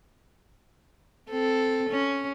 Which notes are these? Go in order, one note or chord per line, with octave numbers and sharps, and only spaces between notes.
C4 A4
C#4